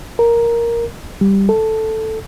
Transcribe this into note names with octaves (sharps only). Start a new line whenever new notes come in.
A#4
G3
A4